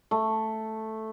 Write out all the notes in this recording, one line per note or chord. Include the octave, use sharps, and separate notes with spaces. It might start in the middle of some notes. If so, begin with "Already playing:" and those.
A3